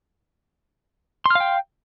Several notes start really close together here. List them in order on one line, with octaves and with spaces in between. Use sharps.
C6 F6 F5 G5